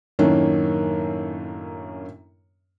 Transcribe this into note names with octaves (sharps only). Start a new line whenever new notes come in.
F#2 A2 D#3 A#3 C#4 D4